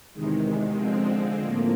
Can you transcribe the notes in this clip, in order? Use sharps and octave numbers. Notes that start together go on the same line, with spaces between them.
E2 C3 D#3 G#3
D3 F3 G#3 C4
A2 F3 A#3